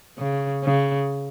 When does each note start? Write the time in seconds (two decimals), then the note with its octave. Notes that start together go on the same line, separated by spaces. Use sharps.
0.18 C#3
0.64 C#3